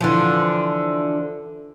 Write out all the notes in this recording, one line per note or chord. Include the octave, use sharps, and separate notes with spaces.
D3 E3 F3